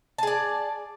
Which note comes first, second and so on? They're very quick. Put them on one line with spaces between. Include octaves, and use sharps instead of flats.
A5 G#4 D5